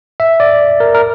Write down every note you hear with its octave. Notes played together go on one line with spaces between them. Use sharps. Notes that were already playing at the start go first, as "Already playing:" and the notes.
E5
D5
A#4
A#4